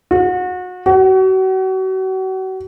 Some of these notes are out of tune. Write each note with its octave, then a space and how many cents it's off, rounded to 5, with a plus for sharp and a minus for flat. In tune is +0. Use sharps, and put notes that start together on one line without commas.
F#4 -30
F#4 +35